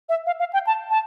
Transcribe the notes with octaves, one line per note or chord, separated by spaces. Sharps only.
E5
F5
F5
G5
A5
A5